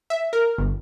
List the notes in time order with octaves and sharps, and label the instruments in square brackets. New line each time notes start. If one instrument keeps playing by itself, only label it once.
[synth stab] E5
A#4
G1